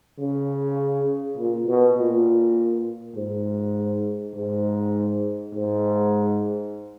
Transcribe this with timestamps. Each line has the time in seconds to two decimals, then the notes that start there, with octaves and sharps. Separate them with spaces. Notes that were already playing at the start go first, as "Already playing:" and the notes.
0.20 C#3
1.38 A#2
1.67 B2
1.98 A#2
3.16 G#2
4.36 G#2
5.55 G#2